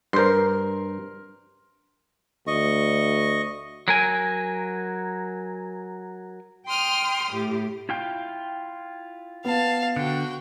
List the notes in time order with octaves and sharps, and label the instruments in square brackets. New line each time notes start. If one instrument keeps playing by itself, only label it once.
[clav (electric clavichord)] G2 C5 [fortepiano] A#4 C6
[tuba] D2 [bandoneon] D#5 C#6
[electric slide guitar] F#3 A#4 G#5
[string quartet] G5 C6 D#6 F6
A2 G4
[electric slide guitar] E4 F4 G5
[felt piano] B3 [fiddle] F5 A5
[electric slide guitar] D3 [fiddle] F#4 G5